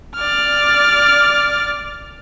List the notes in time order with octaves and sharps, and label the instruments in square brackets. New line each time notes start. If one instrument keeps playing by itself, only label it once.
[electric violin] D5 F6